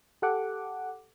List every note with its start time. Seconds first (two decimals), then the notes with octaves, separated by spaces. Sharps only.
0.22 G4 A4 F#5 D6